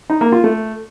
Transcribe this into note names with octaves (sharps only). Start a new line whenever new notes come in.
D#4
A#3
F4
A3